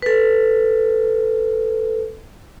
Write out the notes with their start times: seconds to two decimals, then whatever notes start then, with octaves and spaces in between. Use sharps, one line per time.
0.02 A4 B4